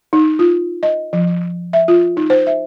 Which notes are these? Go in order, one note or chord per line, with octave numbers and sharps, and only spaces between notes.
D#4
F4
D#5
F3
E5
F4
D#4
C5
E5